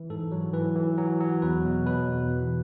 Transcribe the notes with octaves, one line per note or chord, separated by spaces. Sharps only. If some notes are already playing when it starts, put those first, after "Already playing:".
Already playing: E3
G#2 A4
F#3
E3 B4
E3
F#3
F#3
E2 B4
B2
B2 B4
E2
E3